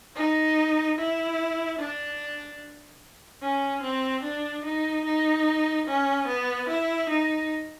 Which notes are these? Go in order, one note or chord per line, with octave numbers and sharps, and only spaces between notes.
D#4
E4
D4
C#4
C4
D4
D#4
D#4
C#4
B3
E4
D#4